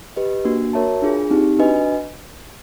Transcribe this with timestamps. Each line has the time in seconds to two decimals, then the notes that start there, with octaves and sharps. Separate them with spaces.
0.16 G4 B4 D#5
0.45 A#3 D4 F#4
0.73 F#4 A#4 C#5 E5 A5
1.02 D4 F4 G#4
1.30 C4 D#4 G4
1.59 D4 F#4 B4 D#5 G#5